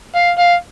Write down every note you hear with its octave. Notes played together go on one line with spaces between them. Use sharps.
F5
F5